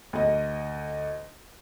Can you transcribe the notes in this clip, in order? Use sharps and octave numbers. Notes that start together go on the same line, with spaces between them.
D2 D#5